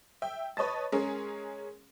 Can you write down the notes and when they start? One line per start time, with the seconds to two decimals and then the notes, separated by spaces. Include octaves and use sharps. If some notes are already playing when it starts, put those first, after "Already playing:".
0.22 E5 G5
0.57 B4 C#5 D#5 A5 A6
0.92 G#3 C#4 G#4 A#4